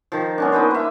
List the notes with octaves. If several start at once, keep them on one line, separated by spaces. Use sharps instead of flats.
D#3 F3
B3 C#4 D4
A#3 D#4 B4 C5
B4 E5